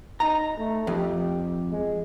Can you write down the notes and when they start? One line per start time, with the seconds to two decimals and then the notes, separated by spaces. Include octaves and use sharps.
0.20 D#4 A#5
0.57 A3
0.87 F2 G4
1.70 G#3